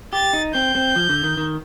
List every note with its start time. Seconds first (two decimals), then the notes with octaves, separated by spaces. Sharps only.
0.13 G4 A6
0.33 D#4
0.54 C4 G6
0.75 C4
0.96 F3
1.09 D3
1.24 D#3
1.37 D#3